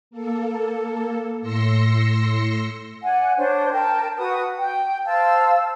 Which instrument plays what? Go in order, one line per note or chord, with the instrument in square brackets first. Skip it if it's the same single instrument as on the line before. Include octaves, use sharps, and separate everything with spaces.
[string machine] A#3 A4
A2 C6 E6 A#6 C#7
[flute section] D5 F#5 G#5
D4 C5 C#5
A#4 G5 A5
F#4 B4 D#6
G5
C5 F5 A5 E6